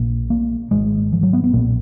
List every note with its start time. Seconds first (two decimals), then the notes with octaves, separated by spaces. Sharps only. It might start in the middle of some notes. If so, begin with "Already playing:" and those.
Already playing: A#1 A#2
0.30 A#3
0.71 G#1 G#2 G#3
1.13 F3
1.23 F#3
1.33 B3
1.44 B3
1.53 B1 A#2 A#3